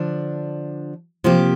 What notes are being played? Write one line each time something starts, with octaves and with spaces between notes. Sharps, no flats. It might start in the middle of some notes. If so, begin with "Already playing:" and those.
Already playing: D3 F3 D4
C3 F3 A#3 G4